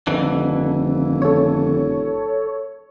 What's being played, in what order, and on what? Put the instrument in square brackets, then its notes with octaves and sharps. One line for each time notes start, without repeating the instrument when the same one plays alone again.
[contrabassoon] D#1 [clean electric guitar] F2 D3 E3
[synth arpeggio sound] A4 C#5